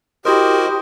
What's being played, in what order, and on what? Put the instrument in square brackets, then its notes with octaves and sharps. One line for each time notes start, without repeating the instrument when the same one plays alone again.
[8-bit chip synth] E4 F#4 A#4 [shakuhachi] G4 [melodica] C5 D#5